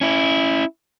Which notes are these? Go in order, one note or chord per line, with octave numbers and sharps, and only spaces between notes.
C#4 E4